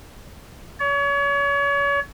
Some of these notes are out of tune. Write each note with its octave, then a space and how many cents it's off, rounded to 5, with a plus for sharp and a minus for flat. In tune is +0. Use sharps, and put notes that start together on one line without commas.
C#5 +35